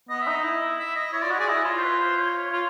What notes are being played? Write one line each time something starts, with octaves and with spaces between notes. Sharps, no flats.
B3 D#5
D#4 E5
D#5
E4
E5
D#5
E4 C#5
F4 D5
F#4 D#5
G#4 D5
E4 D#5
F4 C#5
C5
B4
C5
C#5
F4